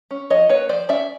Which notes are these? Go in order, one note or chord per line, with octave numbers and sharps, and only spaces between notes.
C#4
F3 C#5 D#5
A#3 B4 C#5
F3 C5 D5
C#4 D5 E5